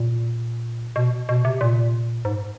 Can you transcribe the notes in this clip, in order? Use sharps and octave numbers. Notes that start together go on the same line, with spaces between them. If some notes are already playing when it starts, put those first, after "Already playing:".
Already playing: A#2
B2
B2
C3
A#2
G#2